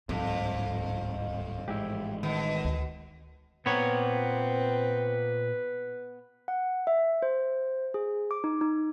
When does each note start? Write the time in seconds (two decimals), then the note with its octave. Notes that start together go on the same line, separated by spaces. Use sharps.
0.09 D1 C2 F2 G#2 C3
1.68 A1 G#3 E4 G4
2.23 B2 D#3
2.64 D2
3.66 A#2 B3 C4 B4 C#5 A#5
6.48 F#5
6.87 E5
7.22 C5
7.94 G#4
8.31 D6
8.44 D#4
8.61 D#4